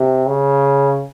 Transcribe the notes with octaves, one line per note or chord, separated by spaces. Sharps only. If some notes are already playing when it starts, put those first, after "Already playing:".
Already playing: C3
C#3